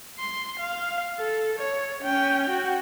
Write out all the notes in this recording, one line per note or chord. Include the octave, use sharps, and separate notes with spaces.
C6
F5
A4
C#5
C#4 G5
F#4